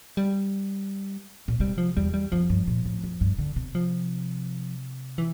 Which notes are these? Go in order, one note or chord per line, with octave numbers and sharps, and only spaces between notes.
G3
A#2
C3 G3
F3
E2 G3
G3
F2 F3
G2
A#2
A2
F2
G2
D3
C3
F3
E3